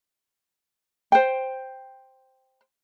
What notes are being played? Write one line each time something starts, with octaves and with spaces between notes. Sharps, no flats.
C5 G5